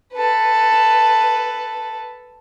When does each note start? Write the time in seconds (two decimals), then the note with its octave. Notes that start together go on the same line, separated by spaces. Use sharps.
0.13 A4 B4